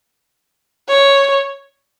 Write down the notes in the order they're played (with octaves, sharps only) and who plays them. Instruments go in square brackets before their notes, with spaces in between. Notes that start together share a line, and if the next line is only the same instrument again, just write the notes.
[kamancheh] C#5